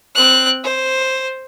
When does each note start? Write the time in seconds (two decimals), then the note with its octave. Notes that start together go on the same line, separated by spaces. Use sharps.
0.15 C4 F#6
0.64 C5